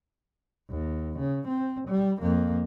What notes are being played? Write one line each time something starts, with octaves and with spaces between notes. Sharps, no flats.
D#2
C#3
C4
G3
F2 A#3